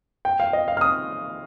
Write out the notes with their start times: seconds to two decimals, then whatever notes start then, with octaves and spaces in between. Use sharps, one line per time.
0.25 G5
0.40 F5
0.53 D#5
0.68 F5
0.77 F6
0.81 D#6